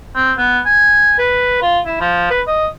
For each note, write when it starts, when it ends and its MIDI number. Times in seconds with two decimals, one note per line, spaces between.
0.15 0.33 60
0.38 0.60 59
0.66 1.18 80
1.19 1.60 71
1.62 1.80 65
1.86 2.00 64
2.01 2.27 53
2.31 2.41 71
2.48 2.67 75